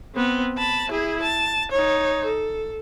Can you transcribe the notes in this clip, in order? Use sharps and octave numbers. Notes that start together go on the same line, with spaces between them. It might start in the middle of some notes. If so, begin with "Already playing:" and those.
B3 C4
A5 B5
E4 G#4
A5
D#4 C#5
A4